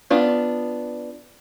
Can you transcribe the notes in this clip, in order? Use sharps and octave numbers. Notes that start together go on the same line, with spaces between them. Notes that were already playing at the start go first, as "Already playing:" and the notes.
B3 D4 F4